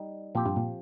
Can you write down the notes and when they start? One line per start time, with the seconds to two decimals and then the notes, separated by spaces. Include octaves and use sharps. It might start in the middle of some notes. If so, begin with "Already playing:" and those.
Already playing: G3 D#4
0.35 A#2 F3 C4 G4
0.46 G2
0.56 A#2